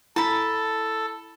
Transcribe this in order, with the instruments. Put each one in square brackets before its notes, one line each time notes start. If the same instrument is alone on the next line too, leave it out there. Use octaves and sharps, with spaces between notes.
[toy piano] E4 [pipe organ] A4 [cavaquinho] A5 B5